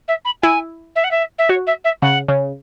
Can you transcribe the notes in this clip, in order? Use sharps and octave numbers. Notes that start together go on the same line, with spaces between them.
E5
B5
E4 G#5
E5
F#5
E5
E5
F#4 C#5
E5
E5
C#3 F#5
C#3